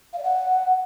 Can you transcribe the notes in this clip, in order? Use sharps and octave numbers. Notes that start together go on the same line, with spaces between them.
F5
D5
F#5